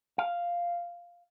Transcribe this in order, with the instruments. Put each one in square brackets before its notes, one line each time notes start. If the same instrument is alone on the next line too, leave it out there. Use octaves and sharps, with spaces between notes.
[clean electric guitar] F5